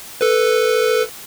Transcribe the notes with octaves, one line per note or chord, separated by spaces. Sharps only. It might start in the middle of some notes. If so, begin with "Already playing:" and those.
A4 B4